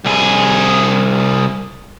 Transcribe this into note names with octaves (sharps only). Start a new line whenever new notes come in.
C2 G#4